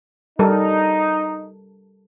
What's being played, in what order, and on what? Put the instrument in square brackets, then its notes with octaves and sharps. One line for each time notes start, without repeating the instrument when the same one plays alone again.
[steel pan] G3 A4 A#4 [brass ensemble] D#4